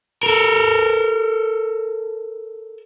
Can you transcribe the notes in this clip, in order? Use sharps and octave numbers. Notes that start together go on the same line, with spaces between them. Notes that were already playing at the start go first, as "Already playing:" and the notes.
A4 A#4